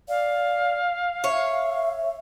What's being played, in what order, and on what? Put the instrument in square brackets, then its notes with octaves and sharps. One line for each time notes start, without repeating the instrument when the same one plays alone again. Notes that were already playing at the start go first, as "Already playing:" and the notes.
[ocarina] D5 [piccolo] F5
[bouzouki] C#5 [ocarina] E5